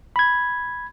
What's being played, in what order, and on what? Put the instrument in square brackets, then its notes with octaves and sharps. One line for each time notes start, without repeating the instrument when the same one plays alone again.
[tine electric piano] B5 G#6